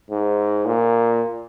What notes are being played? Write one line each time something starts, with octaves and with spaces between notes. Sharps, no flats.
G#2
A#2